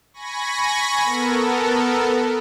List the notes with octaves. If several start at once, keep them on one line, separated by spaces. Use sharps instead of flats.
G#5 B5 C#6 A#6
B3 A4 A#4